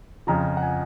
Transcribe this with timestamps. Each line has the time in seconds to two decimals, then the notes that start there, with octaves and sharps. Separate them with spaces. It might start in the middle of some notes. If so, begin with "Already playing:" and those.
0.27 F2 C#3 F3 A#5
0.57 F#5
0.62 G#5